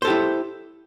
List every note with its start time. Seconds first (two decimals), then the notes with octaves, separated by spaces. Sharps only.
0.02 C5
0.05 A4
0.07 G4
0.10 E4